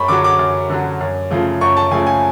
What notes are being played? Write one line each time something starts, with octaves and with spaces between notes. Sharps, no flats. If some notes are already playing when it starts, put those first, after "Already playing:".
Already playing: F#2 B5 C#6
D3 F#3 D6
D6
F#2
D3 F#3
F#2
C#3 F3 A3
F#2 C#6
A5
C#3 F3 A3 G#5
G#5